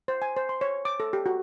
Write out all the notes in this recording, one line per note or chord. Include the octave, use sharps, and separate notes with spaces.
C5
G#5
C5
C6
C#5
D6
A4
G4
F#4